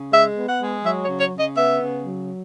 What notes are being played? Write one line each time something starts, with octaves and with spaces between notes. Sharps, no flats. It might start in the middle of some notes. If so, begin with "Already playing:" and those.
Already playing: C#3
G#3 E5
B3
F#5
G#3
F#3 E5
C#5
C#3
C#5
C#3
D#5
B3 E5
C#3
F#3